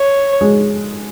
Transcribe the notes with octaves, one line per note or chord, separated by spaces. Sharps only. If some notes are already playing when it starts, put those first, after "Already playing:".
Already playing: C#5
G#3